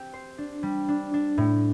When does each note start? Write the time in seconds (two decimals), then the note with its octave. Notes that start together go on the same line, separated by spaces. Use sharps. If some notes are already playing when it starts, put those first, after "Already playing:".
Already playing: C4 G4
0.13 C5
0.38 D4
0.63 G3
0.89 D4
1.14 D4
1.38 A2